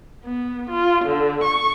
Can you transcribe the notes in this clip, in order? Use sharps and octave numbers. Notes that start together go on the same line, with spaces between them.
B3
F4
D3
C#6